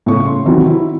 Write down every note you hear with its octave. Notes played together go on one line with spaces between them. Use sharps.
A2 C#3 C#6
C6
C3 D#3 E3 F#3
E4